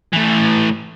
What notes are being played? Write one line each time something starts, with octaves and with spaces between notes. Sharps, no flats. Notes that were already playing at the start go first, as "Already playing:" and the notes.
A2 E3